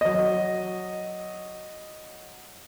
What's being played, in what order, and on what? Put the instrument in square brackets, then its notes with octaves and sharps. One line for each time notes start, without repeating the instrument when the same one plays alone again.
[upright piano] F#3 D#5